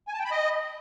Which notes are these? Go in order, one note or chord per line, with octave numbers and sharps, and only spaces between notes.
G#5
A5
G5
B5
D#5